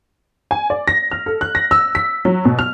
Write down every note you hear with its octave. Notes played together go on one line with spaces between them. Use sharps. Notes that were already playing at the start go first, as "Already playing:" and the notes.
G#5
D5
A#6
F6
A4
F#6
A#6
E6
B6
F#3
B2
F6